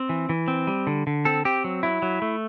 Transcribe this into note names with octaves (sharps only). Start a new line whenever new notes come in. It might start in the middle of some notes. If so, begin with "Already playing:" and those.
Already playing: C4
E3
E3
C4
G3
D3
D3
C4 A4
C4 G4
F#3
F#3 E4
F#3
A3